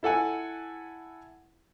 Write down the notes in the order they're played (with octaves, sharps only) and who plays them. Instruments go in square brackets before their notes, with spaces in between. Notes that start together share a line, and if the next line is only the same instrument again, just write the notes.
[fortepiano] E4 A4 F#5 G#5